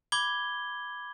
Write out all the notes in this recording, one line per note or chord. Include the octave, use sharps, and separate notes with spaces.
B5 D6 G#6 G7